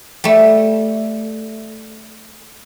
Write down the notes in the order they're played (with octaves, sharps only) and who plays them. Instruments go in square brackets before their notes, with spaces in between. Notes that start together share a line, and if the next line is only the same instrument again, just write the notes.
[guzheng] G3 A3